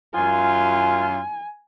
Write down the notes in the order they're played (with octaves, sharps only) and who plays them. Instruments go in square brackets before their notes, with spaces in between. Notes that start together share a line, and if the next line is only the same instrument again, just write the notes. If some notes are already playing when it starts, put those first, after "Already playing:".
[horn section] F#2 F4 [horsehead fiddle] G#5